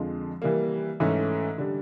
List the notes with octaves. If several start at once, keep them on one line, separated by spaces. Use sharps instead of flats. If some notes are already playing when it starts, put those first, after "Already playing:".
Already playing: F2 D3 F3 G#3
E3 G3 A#3
G#2 E3 A3 C#4
D3 G3